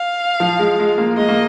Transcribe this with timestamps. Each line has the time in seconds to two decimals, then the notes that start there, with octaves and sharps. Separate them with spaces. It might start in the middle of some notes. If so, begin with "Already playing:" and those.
Already playing: F5
0.40 F3
0.59 G#3
0.79 G#3
0.98 A#3
1.17 G#3 D#5
1.29 A#3